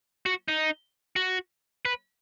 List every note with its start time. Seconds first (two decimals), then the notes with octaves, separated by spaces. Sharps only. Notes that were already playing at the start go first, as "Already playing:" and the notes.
0.26 F#4
0.48 D#4
1.16 F#4
1.85 B4